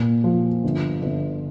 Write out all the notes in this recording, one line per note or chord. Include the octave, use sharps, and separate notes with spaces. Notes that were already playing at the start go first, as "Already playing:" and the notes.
Already playing: A#2
F3
G1
G1